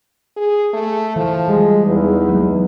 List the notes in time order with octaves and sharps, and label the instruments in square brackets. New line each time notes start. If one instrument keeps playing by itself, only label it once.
[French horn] G#4
A3
[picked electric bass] E3 [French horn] F3
[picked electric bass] G3 [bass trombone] G#3
[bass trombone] E2 [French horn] D#4
[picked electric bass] F#3 G#3 A#3